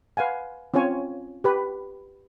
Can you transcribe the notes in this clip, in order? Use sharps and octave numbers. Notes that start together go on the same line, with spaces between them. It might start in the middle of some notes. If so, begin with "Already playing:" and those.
B4 F5 F#5 G#5
C4 C#4 F4 C#5 G#5
G4 B4 B5